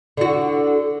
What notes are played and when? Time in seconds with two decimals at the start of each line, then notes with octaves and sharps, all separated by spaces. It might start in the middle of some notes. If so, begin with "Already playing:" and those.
0.17 D3 F#4